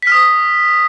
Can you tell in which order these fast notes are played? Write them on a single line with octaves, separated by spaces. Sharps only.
B6 F6 D#6